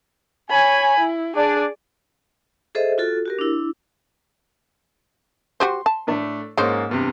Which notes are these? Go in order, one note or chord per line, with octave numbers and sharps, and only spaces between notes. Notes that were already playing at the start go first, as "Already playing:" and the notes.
C#5 G#5 B5
E4
D4 G#4 D5
G#4 A4 C5 D#5 E5
F4 F#4 A4
F#4 G4 A#4
D4 E4
F#4 G4 C5 C6
A5
A2 A3 D4
G#2 G#3 A#3 C#4 C5 C#5
E2 G2 C3